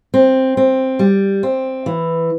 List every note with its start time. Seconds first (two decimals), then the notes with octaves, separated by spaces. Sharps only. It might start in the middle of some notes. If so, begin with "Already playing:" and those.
0.14 C4
0.57 C4
0.99 G3
1.43 C4
1.86 E3